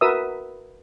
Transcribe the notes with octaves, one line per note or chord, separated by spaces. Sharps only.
F#4 A#4 B4 E5 D#6 E6